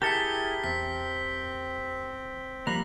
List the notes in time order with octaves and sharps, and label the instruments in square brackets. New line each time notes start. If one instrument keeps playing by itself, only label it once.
[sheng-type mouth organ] E4 G#4 [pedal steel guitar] G4 A#4 A5 [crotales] B6 C#7 G7
[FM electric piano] E2 [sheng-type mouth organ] C4 [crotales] B6
[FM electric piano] F3 B5 [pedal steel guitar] G3 A#3 A#5 [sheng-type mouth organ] F#6 [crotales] A#6